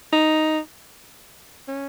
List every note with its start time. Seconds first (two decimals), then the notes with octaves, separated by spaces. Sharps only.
0.12 D#4
1.68 C#4